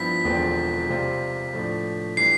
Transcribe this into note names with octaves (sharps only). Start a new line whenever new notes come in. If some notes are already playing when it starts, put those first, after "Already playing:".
Already playing: G2 F3 B3 E4 B6
E1 E2 D3 F3 C4
C3 G3 C4 F4 C5
A2 F3 A3 D4
E3 G3 D4 C7